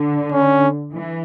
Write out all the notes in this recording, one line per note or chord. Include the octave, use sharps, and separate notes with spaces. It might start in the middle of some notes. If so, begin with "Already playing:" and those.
Already playing: D3
C#4
E3